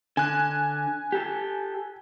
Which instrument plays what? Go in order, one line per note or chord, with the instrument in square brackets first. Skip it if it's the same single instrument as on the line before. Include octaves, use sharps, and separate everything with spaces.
[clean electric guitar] D3 [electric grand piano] G#5 F#6
[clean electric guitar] G4 A4